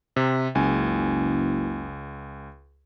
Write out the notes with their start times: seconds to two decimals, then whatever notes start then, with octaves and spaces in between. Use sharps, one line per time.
0.16 C3
0.55 F#1 C#2 G#5